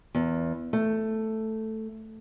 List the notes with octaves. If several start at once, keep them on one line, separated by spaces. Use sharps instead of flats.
E2
A3